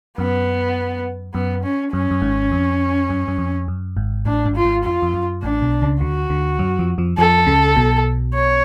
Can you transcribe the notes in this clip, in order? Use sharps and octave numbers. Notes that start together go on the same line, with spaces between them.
F#2 B3
F#2 B3
C#4
F#2 C#4
F#2
G#1 G#2
F2
F#2
F#2
F2
F#2
G#1 G#2
A1 A2 D4
G#1 G#2
F4
G#1 G#2
F2 F4
F2
F#2
A1 A2 D4
B1 B2
C#2 C#3
D2 D3 F#4
D2 D3
F#2 F#3
F2 F3
F2 F3
F2 F3 A4
C#2 C#3
B1 B2
C#5